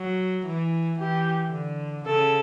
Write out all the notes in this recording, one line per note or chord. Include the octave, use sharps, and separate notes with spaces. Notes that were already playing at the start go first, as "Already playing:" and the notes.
Already playing: F#3
E3
E3 G4
D3
C#3 A4